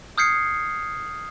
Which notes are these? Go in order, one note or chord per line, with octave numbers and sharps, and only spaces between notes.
D#6 F6 G6 G#6 C7 C#7